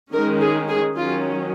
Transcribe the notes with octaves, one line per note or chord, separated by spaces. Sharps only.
D#3 G#3 C#4 A#4
G#4
G#4
D#3 F#3 C#4 F4